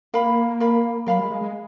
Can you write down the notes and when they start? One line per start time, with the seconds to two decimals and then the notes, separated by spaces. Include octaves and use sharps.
0.14 A#3 A#4 F5 B5
0.60 A#4 F5 B5
1.06 F#3 A#4 F5 B5
1.19 G#3
1.30 G#3
1.41 G#3